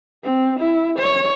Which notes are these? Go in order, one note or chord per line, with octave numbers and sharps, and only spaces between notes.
C4
E4
C#5